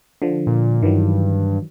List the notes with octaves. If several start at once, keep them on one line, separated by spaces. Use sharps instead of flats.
D3 F3
A#2
G2 D#3 E3 F#3